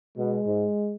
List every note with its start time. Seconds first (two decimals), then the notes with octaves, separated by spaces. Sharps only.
0.17 B2 G#3
0.46 G#2